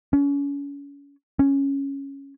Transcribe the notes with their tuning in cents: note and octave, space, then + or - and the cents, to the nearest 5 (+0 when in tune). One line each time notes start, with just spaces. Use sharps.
C#4 +35
C#4 -5